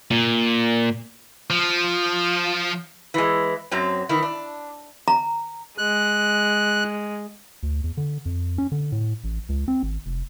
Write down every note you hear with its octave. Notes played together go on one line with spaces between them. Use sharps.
A#2
F3
E3 G#3
F#2 F#3 C4
D#3 E3 E4
D4
A#5
G#3 F#6
D2
E2
D3
F2
C#4
D3
A2
A1
C#2
C4
G#1
F1